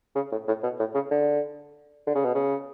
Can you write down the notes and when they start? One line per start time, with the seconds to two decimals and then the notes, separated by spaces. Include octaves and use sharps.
0.15 C#3
0.32 A2
0.48 A2
0.63 B2
0.79 A2
0.94 C#3
1.11 D3
2.07 D3
2.15 C#3
2.24 B2
2.35 C#3